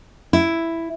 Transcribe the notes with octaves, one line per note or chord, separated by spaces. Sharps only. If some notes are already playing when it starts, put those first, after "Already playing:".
E4